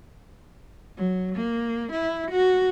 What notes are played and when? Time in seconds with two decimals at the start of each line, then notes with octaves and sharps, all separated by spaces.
0.97 F#3
1.36 A#3
1.92 E4
2.31 F#4